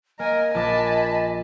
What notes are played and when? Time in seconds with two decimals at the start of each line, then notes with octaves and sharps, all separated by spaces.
0.19 A#3 A#4 D#5 G#5
0.55 A#1 A5 B5 D6